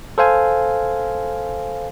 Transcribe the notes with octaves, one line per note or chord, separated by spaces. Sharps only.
A4 C5 F5 G#5